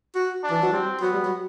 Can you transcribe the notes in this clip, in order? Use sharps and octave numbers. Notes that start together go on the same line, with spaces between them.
F#4
D4
E3
F#3
G3 C4
F#3 B3
G3
F#3